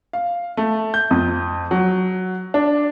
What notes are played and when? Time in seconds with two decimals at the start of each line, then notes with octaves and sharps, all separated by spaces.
0.13 F5
0.57 A3
0.94 G6
1.11 F2
1.71 F#3
2.54 D4